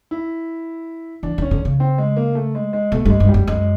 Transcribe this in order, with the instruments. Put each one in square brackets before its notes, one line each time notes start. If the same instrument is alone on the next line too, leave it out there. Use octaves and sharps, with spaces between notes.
[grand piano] E4
[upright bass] E3 [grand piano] D4
[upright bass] D#3 [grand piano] C#4
[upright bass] D3
C#3
[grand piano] C4
G#3
A#3
A3
G#3
G#3
[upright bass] B2 [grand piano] A3
[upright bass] G2 [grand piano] G#3
[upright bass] G2
[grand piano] G3
[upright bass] F#2
[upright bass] F#2 [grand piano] G#3